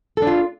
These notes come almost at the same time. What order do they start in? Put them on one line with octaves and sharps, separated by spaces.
A4 D4 F4